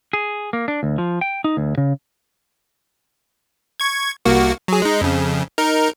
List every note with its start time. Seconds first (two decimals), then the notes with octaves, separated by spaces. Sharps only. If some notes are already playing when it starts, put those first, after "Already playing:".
0.13 G#4
0.53 A#3
0.68 D4
0.83 D2
0.98 F3
1.21 G5
1.44 D#4
1.57 D2
1.78 C#3
3.80 C#6 G#6
4.25 C2 A#3 F#4
4.68 F#3 G#4
4.82 G#3 D#4
5.01 F2 C#3
5.58 D#4 A#4